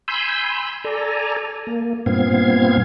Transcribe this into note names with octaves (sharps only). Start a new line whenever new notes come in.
G#5 B5 C6 E6 G6
A4 D5 G#5 A#5
A#3
G2 A#2 B3 C4 F5 G#6